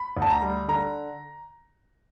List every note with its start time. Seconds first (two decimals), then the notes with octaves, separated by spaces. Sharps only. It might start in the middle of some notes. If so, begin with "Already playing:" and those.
Already playing: B5
0.17 D2
0.22 A5
0.30 A#5
0.42 G3
0.68 D3 A#5